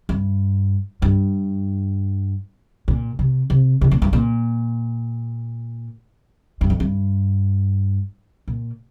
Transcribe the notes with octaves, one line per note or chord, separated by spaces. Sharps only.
G2
G2
A#2
C3
C3
C3
A#2
G2
A#2
G2
F2
G2
A#2